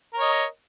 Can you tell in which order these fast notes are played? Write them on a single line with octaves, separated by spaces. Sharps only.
A#4 C#5 D#5